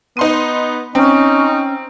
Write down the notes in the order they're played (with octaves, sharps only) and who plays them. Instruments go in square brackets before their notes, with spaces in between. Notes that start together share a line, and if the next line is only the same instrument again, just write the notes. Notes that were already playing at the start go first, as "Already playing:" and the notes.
[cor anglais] B3 [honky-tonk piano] D#4 C6 D#7
[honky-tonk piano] C4 [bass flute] C#4 [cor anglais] D#4